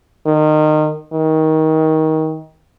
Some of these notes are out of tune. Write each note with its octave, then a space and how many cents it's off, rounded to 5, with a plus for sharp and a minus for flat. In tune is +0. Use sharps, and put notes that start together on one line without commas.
D#3 -25
D#3 +20